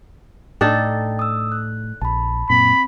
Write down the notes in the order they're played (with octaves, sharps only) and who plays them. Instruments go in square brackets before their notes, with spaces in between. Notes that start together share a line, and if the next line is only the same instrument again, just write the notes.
[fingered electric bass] A2 [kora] D4 D#4 A4 [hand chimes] G5
[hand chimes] D#6 E6
F#6
[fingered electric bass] A#1 [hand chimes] A5 B5
[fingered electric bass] F#2 A#2 [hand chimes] C4 [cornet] B5